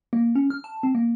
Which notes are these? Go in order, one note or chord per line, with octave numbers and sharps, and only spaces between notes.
A#3
C#4
F6
A5
C4
A#3